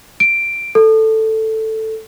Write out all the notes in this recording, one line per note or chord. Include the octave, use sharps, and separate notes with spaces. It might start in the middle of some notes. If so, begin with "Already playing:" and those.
D7
A4